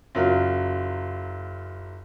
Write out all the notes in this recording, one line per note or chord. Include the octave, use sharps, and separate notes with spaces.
F#1 F#3 F4